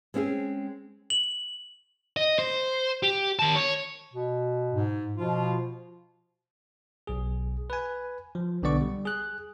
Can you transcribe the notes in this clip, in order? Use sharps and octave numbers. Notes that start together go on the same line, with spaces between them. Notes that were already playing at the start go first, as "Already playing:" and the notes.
G#3 C4 C#4 F#4 G#4
F#7
D#5
C5
G4
D#3 A5
C#5
B2
G#2
B2 F3 F4
B1 G#4
B4 G#5
F3
B1 D3 B3 D5 C#6
G3
G#4 F#6